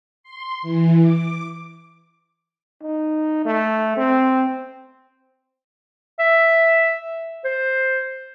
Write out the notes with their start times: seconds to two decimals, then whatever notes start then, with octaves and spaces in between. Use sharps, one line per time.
0.23 C6
0.62 E3
1.00 D6
2.83 D#4
3.46 A3
3.97 C4
6.19 E5
7.45 C5